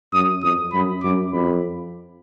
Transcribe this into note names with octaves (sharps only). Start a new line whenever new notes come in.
F#2 D#6
F2 D#6
F#2 B5
F#2 D6
F2 B5